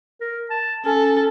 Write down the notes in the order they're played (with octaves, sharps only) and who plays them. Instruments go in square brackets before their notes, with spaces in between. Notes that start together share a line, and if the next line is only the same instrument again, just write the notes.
[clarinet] A#4
A5
[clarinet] C#4 [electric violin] A4